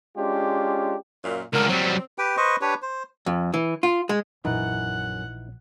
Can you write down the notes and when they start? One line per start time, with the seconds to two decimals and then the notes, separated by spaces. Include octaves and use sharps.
0.17 G#3 C#4 D4 F4 G4
1.24 F#2 A#2
1.53 C#2 D3 A#4
1.69 F#3 G3 C4
2.18 G4 B4 G5
2.37 B4 C5 D#5 C#6
2.61 D4 G4 B4 C#5
2.82 C5
3.26 F2
3.54 E3
3.83 F4
4.09 G#3
4.45 A#1 F#2 E3 D#4 E4 F#5